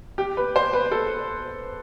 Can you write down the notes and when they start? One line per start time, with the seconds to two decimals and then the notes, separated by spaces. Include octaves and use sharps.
0.18 G4
0.37 B4
0.56 C5
0.73 B4
0.92 A4